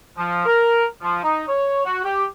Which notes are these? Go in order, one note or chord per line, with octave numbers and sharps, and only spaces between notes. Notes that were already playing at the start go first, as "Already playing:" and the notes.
F3
A#4
F3
D#4
C#5
F#4
G4